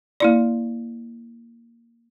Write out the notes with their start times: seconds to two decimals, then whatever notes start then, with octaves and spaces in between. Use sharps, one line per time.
0.20 A#3 E4 D5